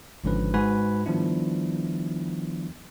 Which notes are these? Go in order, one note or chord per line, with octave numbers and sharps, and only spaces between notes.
G#1 G#2 D3 F3 C#4 B4
G#2 G#3 F#4 B4 G#5 B5
D#3 F3 G3 B3 D4 E4